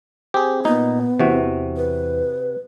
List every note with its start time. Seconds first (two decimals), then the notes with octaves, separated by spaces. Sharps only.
0.34 C4 G4 G#4
0.65 A#2 B3 D#4
1.19 E2 C3 E3 F#4
1.77 B4